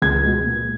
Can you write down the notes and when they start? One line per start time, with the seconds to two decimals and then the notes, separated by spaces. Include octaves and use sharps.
0.02 C#2 G#6
0.23 B2 G#3
0.45 A#2